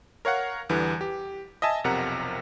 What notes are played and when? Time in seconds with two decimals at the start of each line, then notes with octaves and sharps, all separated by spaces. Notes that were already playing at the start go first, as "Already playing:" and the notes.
0.25 A#4 C#5 F5 F#5
0.69 E2 D3 E3 G3 B3
1.01 G4
1.62 D#5 E5 G#5 A5
1.84 B1 F2 C3 A#4 F#5 A#5